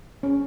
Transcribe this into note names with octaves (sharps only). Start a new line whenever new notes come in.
C#4